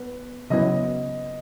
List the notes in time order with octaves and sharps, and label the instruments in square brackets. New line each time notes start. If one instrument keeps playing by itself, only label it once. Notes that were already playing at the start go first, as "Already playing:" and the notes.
Already playing: [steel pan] B3 [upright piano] B4
[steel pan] C#3 F#3 B3 E4 [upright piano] D#5